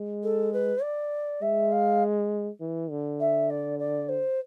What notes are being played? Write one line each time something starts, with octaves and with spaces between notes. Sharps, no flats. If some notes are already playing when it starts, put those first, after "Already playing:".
Already playing: G#3
A4
B4
D5
G#3 E5
F5
E3
D3
E5
D5
D5
C5